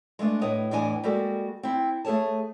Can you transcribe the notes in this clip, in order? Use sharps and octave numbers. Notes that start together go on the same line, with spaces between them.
G#3 A3 B3 D4
A2 B4 C#5 D#5
E2 A2 E3 D4 D#5 G#5
G3 G#3 A#3 F#4 A4
C4 E4
A3 G#4 A4 C#5 A5